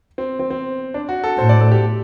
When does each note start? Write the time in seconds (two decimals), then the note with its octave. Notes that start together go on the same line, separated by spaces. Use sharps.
0.18 C4
0.39 C4
0.50 C4
0.94 D4
1.09 F#4
1.24 A4
1.38 A2 C5
1.49 D5
1.61 A4
1.71 G4